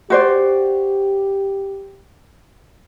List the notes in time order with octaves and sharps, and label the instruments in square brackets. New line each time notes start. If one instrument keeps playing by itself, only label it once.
[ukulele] F#4 C5 D5 [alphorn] G4